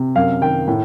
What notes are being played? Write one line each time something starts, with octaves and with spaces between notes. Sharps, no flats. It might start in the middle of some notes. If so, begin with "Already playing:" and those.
Already playing: C3
F#2 F5
D#3 G5
A2